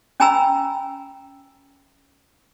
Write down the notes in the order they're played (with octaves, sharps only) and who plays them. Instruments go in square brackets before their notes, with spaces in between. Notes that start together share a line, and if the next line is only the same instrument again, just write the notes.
[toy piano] C#4 G5 G#5 A#5 B5 E6